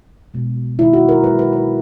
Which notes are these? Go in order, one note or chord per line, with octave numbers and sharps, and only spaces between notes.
B2 G#3
D#3 G#3 E4
F#4
A#4
D#3 G#3 B4
B4
B4